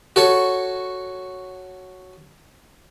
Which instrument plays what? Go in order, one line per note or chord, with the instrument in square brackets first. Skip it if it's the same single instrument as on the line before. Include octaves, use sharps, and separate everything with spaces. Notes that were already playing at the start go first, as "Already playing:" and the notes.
[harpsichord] F#4 A4 C#5